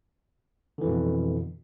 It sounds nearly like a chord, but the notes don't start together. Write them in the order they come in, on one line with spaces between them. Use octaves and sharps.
D3 E3 F2 B2